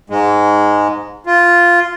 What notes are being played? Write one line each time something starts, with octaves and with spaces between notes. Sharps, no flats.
G#2 G#3
F4